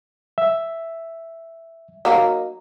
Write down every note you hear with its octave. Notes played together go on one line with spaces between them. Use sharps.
E5
F#3 A#3 D#4